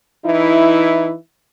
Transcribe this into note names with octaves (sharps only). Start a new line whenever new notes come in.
E3 D#4 E4